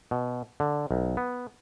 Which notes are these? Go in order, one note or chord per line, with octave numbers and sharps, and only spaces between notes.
B2
D3
B1
B3